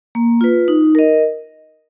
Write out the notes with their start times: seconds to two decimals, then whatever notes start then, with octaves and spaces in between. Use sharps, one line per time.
0.15 A#3
0.41 F4 B4
0.68 D#4
0.95 A#4 D#5